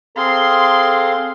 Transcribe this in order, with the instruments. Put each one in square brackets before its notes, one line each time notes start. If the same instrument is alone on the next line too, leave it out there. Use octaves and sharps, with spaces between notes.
[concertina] C4 G#4 F5 [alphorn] A4 [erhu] C6